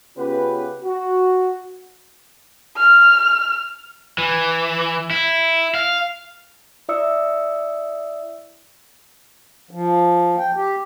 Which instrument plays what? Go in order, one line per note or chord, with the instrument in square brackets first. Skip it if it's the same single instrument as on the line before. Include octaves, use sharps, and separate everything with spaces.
[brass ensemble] C#3 B3 C#4 F4 G4 B4
F#4
[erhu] F6
[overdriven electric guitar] E3
E4
F5
[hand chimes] E4 D5 E5 D#6 E6 C#7
[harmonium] F3
G5
G4